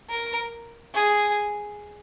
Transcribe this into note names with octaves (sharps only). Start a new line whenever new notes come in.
A#4
G#4